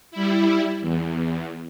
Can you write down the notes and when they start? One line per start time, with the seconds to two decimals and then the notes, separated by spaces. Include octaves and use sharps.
0.11 G3 E4
0.81 E2